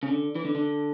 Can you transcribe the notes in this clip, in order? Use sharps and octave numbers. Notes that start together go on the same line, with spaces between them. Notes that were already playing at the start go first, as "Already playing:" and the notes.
C#3
D3
E3
D3
D3